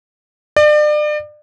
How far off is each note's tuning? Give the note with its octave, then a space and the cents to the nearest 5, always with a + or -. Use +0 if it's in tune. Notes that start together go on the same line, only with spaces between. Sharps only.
D5 +35